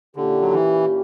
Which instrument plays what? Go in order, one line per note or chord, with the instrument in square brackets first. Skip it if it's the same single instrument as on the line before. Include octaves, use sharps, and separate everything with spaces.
[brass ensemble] A#2 A#3 C#4 E4 G4 [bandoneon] D3
[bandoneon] F#3
E3